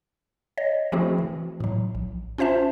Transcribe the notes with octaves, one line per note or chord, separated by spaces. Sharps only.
C#5 D#5
F3 A3 C4 E4 F#4 G#4
E3
A2 F#3
A#1
C#4 F4 C5 E5 A5